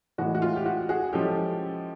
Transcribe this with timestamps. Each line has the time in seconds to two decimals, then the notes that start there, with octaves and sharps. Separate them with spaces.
0.18 A2 E3 G#3 F#4
0.35 F#4
0.42 F4
0.56 G4
0.66 F#4
0.89 F#4 G#4
1.13 F3 G#3 C#4 E4 G4 A4